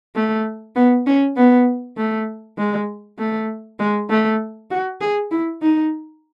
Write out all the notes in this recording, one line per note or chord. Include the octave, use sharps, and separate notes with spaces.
A3
B3
C#4
B3
A3
G#3
A3
G#3
A3
F#4
G#4
E4
D#4